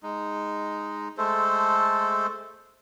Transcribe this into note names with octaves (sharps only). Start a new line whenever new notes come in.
G#3 D#4
G#3 A3 A4 C5